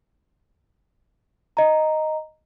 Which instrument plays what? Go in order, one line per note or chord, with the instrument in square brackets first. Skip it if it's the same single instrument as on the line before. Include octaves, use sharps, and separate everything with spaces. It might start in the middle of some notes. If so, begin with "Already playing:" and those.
[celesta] D#5 A#5